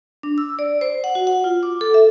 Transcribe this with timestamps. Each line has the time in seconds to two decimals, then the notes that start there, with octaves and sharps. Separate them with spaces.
0.23 D4
0.38 E6
0.59 D5
0.81 C5
1.04 F#5
1.15 F#4
1.27 F#5
1.44 F4
1.63 D6
1.81 A4
1.94 E5